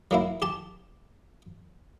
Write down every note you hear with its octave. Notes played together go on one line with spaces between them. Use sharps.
F#3 A#3 E4
G4 A5